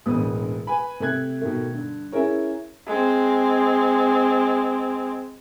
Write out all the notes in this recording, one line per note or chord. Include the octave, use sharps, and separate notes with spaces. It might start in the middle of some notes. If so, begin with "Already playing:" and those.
E1 A1 D2 B3 B4 D#6
B4 G#5 B5
C3 A3 E5 F#6 G#6
B2 D#3 A3
G2 D3
C#4 E4 G#4 A#4 C#5
G#3 C4